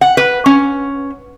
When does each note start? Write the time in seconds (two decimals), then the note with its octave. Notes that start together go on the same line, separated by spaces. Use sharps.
0.01 F#5
0.17 B4
0.46 C#4